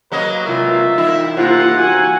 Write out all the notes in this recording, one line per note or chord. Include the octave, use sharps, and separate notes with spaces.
F#3 A#3 B4 D#5
C3 F4 A#4 E5
E3 D#4 E4
C3 A#3 F4 F#5
F#4 G#5